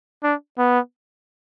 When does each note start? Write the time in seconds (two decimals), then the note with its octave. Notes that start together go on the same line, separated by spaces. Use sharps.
0.23 D4
0.58 B3